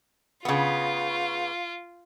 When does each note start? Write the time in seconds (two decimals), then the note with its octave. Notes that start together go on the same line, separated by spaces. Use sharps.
0.45 C#3 B3 F4